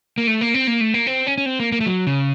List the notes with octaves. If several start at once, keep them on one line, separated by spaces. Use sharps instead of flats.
A#3
A3
A#3
C4
A#3
A3
A#3
C4
C#4
C#4
C4
A#3
A#3
A3
F#3
C#3